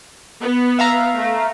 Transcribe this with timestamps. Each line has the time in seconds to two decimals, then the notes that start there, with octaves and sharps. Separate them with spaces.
0.41 B3
0.79 E5 F5 A#5
1.15 A3